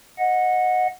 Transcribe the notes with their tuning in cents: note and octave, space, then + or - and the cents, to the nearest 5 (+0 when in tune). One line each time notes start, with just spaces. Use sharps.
D#5 +0 F#5 -15